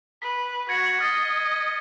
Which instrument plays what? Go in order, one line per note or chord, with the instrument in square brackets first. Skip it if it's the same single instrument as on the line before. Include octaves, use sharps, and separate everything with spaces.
[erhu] B4 [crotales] B6
[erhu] F#4 [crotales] G#6 A#6 C#7
[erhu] D#5 [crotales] F6 A6 C7